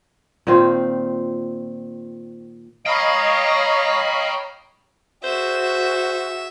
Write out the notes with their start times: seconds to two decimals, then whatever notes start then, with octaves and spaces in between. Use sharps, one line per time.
0.47 A#2 D#3 C4 F4
2.86 C#5 D#5 F5 G5 A#5 B5 C#6
5.24 F#4 G#4 C5 E5